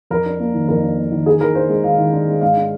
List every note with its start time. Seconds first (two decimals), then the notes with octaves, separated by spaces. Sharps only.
0.10 F2 A#4
0.26 D4
0.40 A#3
0.54 D#3
0.68 F2 A#4
0.83 D4
0.98 A#3
1.12 D#3
1.26 D#3 G#4
1.40 D#3 A#4
1.55 D4 C5
1.70 G#3
1.84 D#3 F5
1.98 D#3
2.12 D4
2.28 G#3
2.41 G#2 F5
2.57 D4